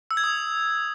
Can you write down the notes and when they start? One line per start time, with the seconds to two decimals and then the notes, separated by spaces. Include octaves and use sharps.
0.11 E6
0.17 G#6
0.24 D#6